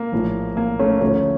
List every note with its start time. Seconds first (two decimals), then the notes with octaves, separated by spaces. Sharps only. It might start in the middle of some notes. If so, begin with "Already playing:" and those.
Already playing: A#3
0.12 A#1 A2 F3
0.57 A#3
0.79 A3 C#4
1.01 D2 D3 F3 A3 C#4